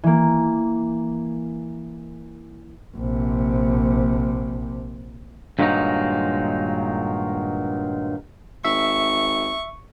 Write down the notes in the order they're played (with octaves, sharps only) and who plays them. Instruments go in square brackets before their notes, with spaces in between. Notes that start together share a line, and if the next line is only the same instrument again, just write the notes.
[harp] E3 A#3
[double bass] A#1 C3
[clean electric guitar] G2 A#2 D#3 F#3 G#3 D#4
[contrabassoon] G#1 [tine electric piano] E5 [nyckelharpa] C#6